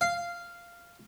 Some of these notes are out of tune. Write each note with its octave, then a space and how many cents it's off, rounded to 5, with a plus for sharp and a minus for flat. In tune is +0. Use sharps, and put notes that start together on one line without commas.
F5 -10